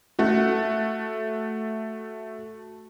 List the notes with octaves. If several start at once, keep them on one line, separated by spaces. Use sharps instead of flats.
A3 F#4